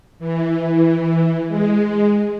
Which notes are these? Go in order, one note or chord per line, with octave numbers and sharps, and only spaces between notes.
E3
G#3